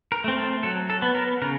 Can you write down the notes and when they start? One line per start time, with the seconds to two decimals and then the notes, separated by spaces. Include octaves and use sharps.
0.12 A#4
0.24 A3 C4
0.38 A4
0.63 F#3 A4
0.90 A4
1.02 B3
1.15 A#4
1.42 C#3 A#4